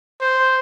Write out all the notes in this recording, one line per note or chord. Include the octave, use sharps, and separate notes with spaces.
C5